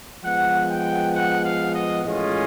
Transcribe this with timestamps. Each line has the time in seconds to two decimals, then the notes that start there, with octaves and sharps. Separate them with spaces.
0.24 F3 G#3 B3 F#5
0.70 G5
1.15 F#5
1.45 F5
1.75 D#5
2.05 A2 E3 G#3 C#4 F4 D#5